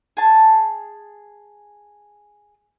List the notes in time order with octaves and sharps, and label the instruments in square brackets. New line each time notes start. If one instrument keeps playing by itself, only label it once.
[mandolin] G#4 A5